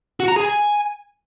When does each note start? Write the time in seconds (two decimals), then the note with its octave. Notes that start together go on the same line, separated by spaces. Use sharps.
0.20 F#4
0.28 A#5
0.36 G#4
0.44 G#5